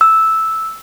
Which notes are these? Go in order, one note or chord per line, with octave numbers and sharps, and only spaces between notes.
E6